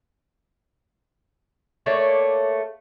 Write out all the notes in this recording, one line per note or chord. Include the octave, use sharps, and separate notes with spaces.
A3 A#3 C#5 D5